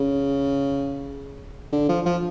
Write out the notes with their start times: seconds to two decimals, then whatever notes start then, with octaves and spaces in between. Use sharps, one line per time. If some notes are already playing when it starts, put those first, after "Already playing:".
Already playing: C#3
1.72 D3
1.89 F3
2.06 F3